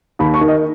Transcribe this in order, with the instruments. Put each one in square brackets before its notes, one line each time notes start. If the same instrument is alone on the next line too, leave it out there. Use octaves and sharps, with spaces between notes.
[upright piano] D#2 B5
C#6
D#3
D#5